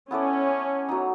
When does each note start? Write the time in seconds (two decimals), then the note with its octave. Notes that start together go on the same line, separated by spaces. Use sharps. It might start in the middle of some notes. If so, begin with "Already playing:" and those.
0.11 B3 C#4 E4 A4 D5
0.89 F#3 B3 D#4